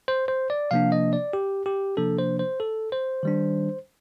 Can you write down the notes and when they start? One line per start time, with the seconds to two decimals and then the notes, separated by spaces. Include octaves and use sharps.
0.08 C5
0.28 C5
0.50 D5
0.71 C3 F3 A#3 D4 F5
0.92 D#5
1.13 D5
1.33 G4
1.66 G4
1.97 C3 F3 A#3 D4 A4
2.19 C5
2.39 C5
2.60 A4
2.92 C5
3.23 D#3 G3 D4